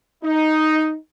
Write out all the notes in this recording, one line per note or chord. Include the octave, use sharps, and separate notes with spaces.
D#4